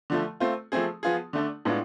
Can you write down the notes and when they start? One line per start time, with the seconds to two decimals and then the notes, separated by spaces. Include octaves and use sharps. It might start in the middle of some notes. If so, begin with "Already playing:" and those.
0.10 D3 F3 A3
0.40 A3 C4 F4
0.72 F3 A3 C4 G#4
1.03 F3 B3 F4 G#4
1.33 D3 A3 D4
1.65 A2 G#3 B3 D4 F4